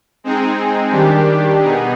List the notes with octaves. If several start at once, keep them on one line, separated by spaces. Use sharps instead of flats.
G#3 C4 D#4 G#4
D#3 G3 D4 G4
B2 B3 D#4 G#4